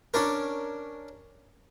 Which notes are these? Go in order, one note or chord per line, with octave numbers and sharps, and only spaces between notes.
C#4 D4 A#4